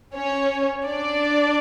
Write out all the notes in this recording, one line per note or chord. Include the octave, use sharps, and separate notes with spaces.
C#4 C#5
D4 D5